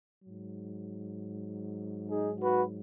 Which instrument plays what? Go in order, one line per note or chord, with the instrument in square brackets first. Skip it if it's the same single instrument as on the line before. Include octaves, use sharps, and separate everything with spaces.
[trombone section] G#2 F#3
D#4 G#4
F#4 B4